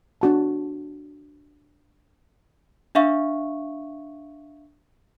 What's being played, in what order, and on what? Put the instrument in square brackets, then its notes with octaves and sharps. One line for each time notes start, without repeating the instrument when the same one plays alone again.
[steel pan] D4 F#4 A5
[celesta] D4 E5 F5 C#6